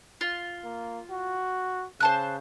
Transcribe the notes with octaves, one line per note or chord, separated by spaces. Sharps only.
F4
A#3
F#4
C#3 C5 A5 F#6